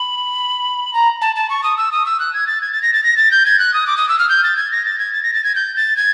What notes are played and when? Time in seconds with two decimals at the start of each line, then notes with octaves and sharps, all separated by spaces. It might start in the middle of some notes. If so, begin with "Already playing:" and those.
Already playing: B5
0.93 A#5
1.21 A5
1.36 A5
1.50 C#6
1.63 D#6
1.77 E6
1.92 D#6
2.06 E6
2.20 F#6
2.34 G#6
2.47 A6
2.61 G#6
2.72 A6
2.82 A#6
2.93 A6
3.04 A#6
3.17 A6
3.31 G6
3.46 G#6
3.59 F#6
3.74 D#6
3.87 D6
3.97 D#6
4.09 E6
4.18 F6
4.29 G6
4.43 A6
4.56 G#6
4.72 A#6
4.85 A6
4.99 G#6
5.12 A6
5.23 A#6
5.34 A6
5.44 G#6
5.55 G6
5.76 A6
5.96 G#6